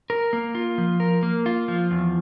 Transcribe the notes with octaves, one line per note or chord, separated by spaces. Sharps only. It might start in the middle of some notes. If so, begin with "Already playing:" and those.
A#4
A#3
F4
F3
A#4
A#3
F4
F3
E2